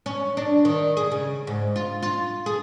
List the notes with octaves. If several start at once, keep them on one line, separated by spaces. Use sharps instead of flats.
C#4
D4
D#3
G#4
C#3
G#2
F4
F4
G#4